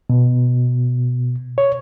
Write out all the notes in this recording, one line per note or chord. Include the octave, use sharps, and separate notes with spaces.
B2
C#5